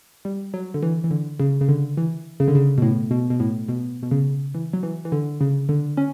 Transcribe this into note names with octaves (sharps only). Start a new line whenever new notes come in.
G3
F#3
D3
E3
E3
D3
C#3
C#3
D3
E3
C#3
D3
C#3
B2
A2
B2
B2
A2
B2
B2
C#3
E3
F#3
E3
E3
D3
C#3
D3
C#4